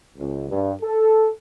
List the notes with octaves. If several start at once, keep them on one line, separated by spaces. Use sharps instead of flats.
C#2
G2
A4